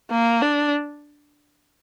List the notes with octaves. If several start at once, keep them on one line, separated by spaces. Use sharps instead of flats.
A#3
D4